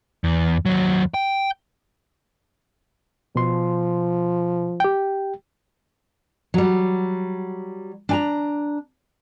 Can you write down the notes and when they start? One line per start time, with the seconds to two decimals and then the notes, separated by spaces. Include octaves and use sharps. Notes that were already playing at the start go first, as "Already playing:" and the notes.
0.24 E2
0.66 D#2 F#3
1.14 G5
3.36 B2 F3 C6
4.80 G4 G5
6.54 F#3 G3
8.09 D4 G#5 A#5